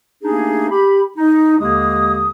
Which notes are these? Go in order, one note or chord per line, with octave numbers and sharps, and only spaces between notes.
A3 A#3 D4 D#4 G4 G#4
G4 B5
D#4
D#2 D3 G#3 A#3 G4 D#6